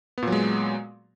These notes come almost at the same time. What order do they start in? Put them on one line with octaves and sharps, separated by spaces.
B3 A#2 F#3 G#3